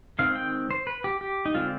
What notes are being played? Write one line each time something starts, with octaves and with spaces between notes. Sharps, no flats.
D#3 G#3 C4 F5
G5
C5
B4
G4
G4
D#4
D3 G#3 C4 F4